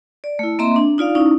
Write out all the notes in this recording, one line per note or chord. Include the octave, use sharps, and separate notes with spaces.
D5
A3 E4
A#3 C4 D#5 E5 A#5 C6
D4
D#4 F4 D5 F5
C#4 D#4 E4